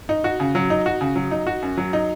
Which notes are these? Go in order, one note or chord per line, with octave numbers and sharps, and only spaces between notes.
D#4
F#4
C#3
F#3
D#4
F#4
C#3
F#3
D#4
F#4
F#2
F#3
D#4